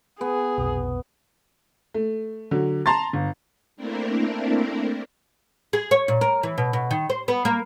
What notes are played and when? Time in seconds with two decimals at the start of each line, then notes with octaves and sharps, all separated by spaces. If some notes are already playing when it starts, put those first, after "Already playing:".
0.21 B3 G#4
0.58 F1 B1
1.94 A3
2.51 D3 F#3
2.86 A5 A#5 C6 A6
3.13 G1
3.76 A3 A#3 C4 D4 E4 A#4
5.73 G#4
5.91 C#5
6.08 A#2
6.21 A#4
6.43 E3
6.58 B2
6.73 B2
6.91 D#3
7.10 C5
7.28 B3
7.45 A#3